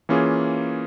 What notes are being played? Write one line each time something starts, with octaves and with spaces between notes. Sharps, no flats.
E3 A#3 C#4 F4 G#4